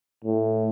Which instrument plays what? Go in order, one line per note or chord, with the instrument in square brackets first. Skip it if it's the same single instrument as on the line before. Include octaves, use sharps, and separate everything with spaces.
[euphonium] A2